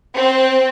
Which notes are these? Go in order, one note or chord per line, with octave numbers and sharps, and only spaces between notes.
C4